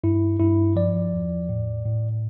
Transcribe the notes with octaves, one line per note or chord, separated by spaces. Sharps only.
G2 E4
G2 E4
F3 D5
E2
A2
A2